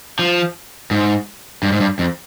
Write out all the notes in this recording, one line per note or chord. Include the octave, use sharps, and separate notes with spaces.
F3
G#2
G2
G#2
G2
F2